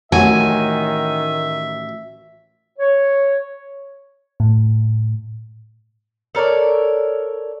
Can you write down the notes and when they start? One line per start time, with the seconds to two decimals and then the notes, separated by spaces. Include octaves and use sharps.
0.12 A1 D#3 F#3 E5 G#5
2.79 C#5
4.40 A2
6.35 A4 A#4 C#5 D5